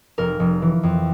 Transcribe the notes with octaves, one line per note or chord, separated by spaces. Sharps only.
F1 A#4
F1
E3
F2